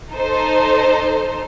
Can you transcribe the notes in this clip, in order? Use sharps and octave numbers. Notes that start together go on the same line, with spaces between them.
D#4 A4 C5